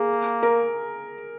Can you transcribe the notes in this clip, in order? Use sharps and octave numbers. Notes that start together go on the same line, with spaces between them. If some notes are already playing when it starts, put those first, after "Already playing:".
Already playing: A#3 G#4
A#4